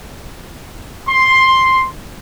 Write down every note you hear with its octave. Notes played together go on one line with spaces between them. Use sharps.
C6